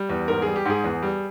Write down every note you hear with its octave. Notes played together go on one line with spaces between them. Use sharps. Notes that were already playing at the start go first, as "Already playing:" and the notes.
Already playing: G3
E2
G#2 A#4
G3 G#4
G4
G#2 G#4
E2
G3